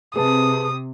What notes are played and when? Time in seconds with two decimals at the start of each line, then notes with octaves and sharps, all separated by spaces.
0.16 C3 G#4 B4 A5 D#6